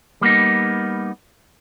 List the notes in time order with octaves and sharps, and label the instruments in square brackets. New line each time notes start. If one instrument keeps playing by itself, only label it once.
[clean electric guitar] G3 A#3 B3 D#4